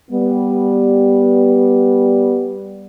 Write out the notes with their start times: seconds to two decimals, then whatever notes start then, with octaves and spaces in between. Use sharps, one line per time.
0.12 G3 B3